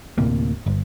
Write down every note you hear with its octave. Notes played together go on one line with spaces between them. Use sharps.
D2 A2 C3 A#3
G1